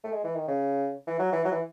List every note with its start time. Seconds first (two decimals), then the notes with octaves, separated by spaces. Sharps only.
0.04 A3
0.12 G#3
0.24 E3
0.36 D#3
0.48 C#3
1.07 E3
1.19 F#3
1.32 E3
1.44 F#3
1.52 E3